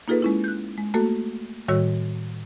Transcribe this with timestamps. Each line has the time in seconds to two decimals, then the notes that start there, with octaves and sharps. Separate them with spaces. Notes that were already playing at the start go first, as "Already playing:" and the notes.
0.08 A#3 D#4 F4 G#4 A4 B4
0.22 G#3 C#4 E4
0.44 F#6 G6
0.78 G#3
0.94 A3 A#3 F#4 A4
1.68 A2 D#3 G3 F#4 C#5 E6